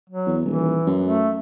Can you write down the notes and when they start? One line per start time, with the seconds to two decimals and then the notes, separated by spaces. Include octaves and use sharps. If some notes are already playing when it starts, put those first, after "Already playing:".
0.10 F#3
0.27 E2
0.45 D#1 E3
0.87 F#2
1.06 A3